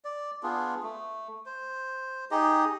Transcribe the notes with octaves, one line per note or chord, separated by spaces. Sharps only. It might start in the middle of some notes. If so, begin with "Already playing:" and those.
D5
B3 D4 F4 G#4
A3
C5
D#4 G4 G#4 D#5